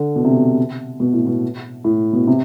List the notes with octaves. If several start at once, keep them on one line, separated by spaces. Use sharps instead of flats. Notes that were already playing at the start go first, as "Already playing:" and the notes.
Already playing: D3
B2
C3
B2
B2
A2
B2
A2
B2
C3